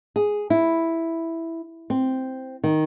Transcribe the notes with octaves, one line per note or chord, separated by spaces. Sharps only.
G#4
E4
C4
D#3